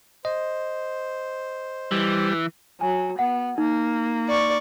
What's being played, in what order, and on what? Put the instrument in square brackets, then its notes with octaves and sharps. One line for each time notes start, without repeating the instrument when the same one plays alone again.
[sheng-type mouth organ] C5 [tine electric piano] D#5
[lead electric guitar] E3 [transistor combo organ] G3
[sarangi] F#3 [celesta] G#5
[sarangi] B3 [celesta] F#5
[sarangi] A#3 [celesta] D#4
[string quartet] D5 C#6